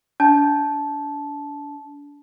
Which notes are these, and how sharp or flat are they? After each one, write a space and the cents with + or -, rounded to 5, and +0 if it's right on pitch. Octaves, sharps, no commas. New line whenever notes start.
D4 -30 A5 -15